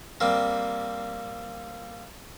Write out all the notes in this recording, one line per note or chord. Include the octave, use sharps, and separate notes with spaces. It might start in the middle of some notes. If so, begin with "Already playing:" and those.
G3 A#3 C4